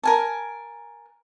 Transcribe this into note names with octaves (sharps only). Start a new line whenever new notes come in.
A#4 G#5 A5